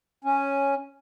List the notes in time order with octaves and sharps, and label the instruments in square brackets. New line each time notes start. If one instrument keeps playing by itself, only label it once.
[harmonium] C#4